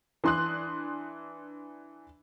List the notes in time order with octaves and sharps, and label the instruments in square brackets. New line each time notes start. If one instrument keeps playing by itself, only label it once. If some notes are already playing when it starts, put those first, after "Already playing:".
[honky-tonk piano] E3 D4 C6 D#6 F#6